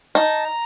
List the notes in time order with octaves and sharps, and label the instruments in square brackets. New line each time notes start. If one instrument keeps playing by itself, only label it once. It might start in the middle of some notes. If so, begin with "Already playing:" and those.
[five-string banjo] D#4 [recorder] A5
[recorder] A#5